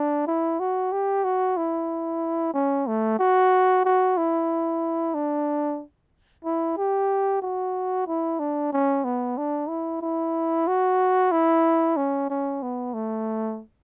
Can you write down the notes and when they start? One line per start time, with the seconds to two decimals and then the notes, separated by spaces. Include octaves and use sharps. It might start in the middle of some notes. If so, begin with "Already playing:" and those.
Already playing: D4
0.27 E4
0.60 F#4
0.92 G4
1.24 F#4
1.57 E4
2.54 C#4
2.87 A3
3.19 F#4
3.85 F#4
4.18 E4
5.14 D4
6.45 E4
6.78 G4
7.42 F#4
8.07 E4
8.39 D4
8.73 C#4
9.04 B3
9.38 D4
9.69 E4
10.01 E4
10.67 F#4
11.32 E4
11.97 C#4
12.30 C#4
12.62 B3
12.94 A3